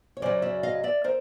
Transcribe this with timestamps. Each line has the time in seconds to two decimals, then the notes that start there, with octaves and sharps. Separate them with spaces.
0.17 C#5
0.22 F#2 C#3 F#3 C5 D5
0.42 D5 E5
0.63 D#5 F5
0.83 D5 E5
1.04 A#4 C5